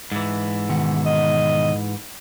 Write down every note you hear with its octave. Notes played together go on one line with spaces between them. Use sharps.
G#2 E3
B2 D#3 F#5
D#5